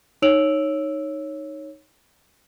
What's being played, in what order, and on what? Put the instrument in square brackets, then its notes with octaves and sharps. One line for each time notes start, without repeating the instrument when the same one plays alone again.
[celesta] D#4 C#5 E6 D7 F7 F#7